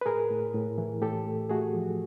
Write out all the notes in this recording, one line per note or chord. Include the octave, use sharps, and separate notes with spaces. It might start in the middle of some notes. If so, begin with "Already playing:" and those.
B4
A2 G#4 A#4
A2
A2
E3
A2 G4 A4
A3
A3 F#4 G#4
F3